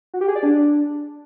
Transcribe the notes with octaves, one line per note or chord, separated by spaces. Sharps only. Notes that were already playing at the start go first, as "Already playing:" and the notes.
F#4
G4
G#4
D5
D4